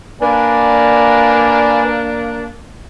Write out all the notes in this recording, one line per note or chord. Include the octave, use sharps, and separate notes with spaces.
A#3 D4 B4 D5 G#5